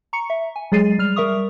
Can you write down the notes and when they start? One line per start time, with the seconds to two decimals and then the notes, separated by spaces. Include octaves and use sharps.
0.13 A#5 C#6 C#7
0.30 E5
0.56 G#5
0.72 F#3 G#3 G#4 A6 C7 D#7
0.99 G3 F6 F7
1.16 G3 A#4 E5 C#6 D#6